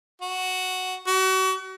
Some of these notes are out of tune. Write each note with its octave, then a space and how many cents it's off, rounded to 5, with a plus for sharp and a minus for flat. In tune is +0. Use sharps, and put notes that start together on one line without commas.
F#4 +0
F#4 +35